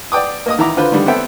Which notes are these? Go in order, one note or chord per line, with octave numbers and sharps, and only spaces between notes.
D5 G5 D6 D#6
A#3 D#5 D#6
D#3 E3 E4 A#5 D6
D3 F4 B4 C5
D3 D#3 G3
B3 C4 A4 E5 G5